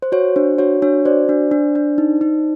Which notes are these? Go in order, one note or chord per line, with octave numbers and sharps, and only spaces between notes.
C5
F#4 C#5
D4 C5
F#4 C#5
D4 C#5
F#4 C5 D5
D4
D4
D4
D#4
D#4